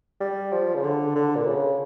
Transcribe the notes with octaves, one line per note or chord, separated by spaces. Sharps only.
G3
F3
C#3
D3
D3
A#2
C#3